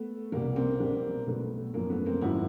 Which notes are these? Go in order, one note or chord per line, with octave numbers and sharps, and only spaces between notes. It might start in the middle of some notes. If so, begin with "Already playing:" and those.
Already playing: A3 B3
C2 B2 G3 A#3
A#3 C4
B1 B2 G3
B1 B2 G3 A3 B3
G#1 F#2 C#3 F3 A#3
A3 B3
A#3 C4
G#1 F#2 C#3 F3 E4 F#4